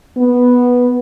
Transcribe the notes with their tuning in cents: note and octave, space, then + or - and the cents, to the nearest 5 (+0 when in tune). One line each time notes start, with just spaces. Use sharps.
B3 -5